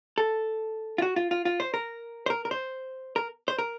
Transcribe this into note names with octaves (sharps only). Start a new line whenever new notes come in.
A4
F4
F#4
F4
F4
F4
C5
A#4
C5
A#4
A#4
C5
A#4
C5
A#4